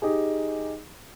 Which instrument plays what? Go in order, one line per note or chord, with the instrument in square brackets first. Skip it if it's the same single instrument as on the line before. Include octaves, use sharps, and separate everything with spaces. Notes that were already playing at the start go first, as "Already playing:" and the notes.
[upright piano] D#4 G4 G#4